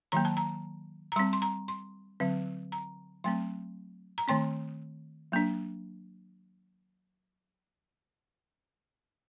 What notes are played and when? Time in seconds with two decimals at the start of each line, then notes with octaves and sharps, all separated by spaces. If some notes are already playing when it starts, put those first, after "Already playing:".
0.12 D#3 F#3 A#3 A#5
0.25 A5
0.37 A#5
1.12 A#5
1.16 G3 C4 C6
1.33 C6
1.42 A#5
1.68 C6
2.20 D3 F#3 C4
2.72 A#5
3.24 F#3 A3 C4 C6
4.18 A#5
4.28 D#3 A3 C4 C6
5.32 F#3 A#3 D4